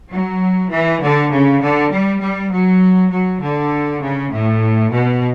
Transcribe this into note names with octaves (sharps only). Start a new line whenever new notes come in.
F#3
E3
D3
C#3
D3
G3
G3
F#3
F#3
D3
C#3
A2
B2